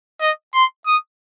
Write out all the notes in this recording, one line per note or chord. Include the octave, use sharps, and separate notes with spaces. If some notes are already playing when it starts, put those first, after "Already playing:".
D#5
C6
D#6